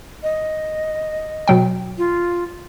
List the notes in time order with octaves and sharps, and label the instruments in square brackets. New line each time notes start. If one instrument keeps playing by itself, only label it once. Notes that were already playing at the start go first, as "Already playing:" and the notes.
[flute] D#5
[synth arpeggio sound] B2 F#3 G5
[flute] F4